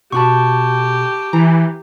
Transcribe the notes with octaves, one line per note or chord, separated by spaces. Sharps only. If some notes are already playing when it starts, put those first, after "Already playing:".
B2 F#4 G4 A5 B5 C#6
E3 A#5